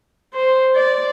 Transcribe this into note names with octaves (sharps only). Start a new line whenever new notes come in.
C5
D5